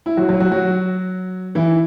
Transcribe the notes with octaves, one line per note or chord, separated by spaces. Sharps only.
E4
F#3 F#4
F#3 F#4
F#3 F#4
F#3 F#4
E3 E4